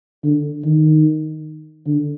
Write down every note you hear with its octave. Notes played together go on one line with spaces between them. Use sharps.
D3
D#3
D3